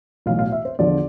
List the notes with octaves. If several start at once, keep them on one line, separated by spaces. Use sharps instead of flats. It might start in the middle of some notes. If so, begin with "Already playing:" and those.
B1 A2 E3 F5
F5
E5
C5
E2 D3 F3 D5